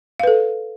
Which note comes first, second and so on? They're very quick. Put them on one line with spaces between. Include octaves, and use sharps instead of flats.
F5 B4 A4